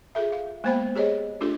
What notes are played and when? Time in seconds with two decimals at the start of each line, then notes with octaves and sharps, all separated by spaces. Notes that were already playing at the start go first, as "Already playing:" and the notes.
0.15 F4 G#4 A4 E5
0.32 F5
0.64 G#3 A#3 B3 C5 G5 B5
0.95 G4 G#4 C#5 D#5
1.40 A3 D4 F4 G4 A4